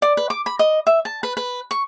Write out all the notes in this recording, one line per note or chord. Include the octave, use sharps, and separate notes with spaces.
D5
B4
D6
B5
D#5
E5
A5
B4
B4
C#6